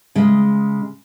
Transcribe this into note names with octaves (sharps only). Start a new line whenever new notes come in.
C#3 G#3